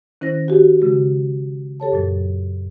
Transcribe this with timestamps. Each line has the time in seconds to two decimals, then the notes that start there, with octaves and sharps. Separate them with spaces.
0.21 D#3 C#4 E4 C5 A#6
0.48 F#4 G4
0.81 C#3 G#3 F#4
1.80 G4 A4 C#5 A5
1.92 F#2 A#2 F#3